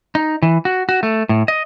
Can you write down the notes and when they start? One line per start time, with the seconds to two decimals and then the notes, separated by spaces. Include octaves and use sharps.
0.15 D#4
0.42 E3
0.65 F#4
0.89 F#4
1.03 A3
1.29 A2
1.48 D#5